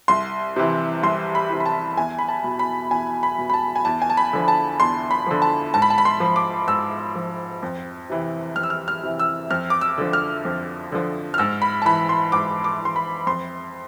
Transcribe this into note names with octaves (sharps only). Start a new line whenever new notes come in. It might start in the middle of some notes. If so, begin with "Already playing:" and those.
C2 C6
C3 E3
C2 C6
B5
C3 E3
B5
A5
E2 G#5
B5
A5
B2
B5
E2 G#5
B5
B2
B5
A5
G#5
E2 A5
G#5
A5
B5
D3 F3
A5
E2 C6
B5
D3 F3
A5
G#2 A5
B5
A5
B5
C6
F3
D6
G#2 E6
F3
F2
C3 E3
F2 F6
E6
F6
F6
C3 E3
E6
F2 F6
D6
E6
D3 F3
F6
F2
D3 F3
F6
G#2 E6
B5
A5
E3 B5
C6
G#2 D6
D6
E3 C6
B5
F2 C6